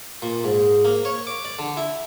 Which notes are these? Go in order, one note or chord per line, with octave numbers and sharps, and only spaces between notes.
A#2
G#2
A#3
C#5
D6
D5
D3
E4